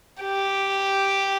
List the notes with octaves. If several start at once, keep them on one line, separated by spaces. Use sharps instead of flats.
G4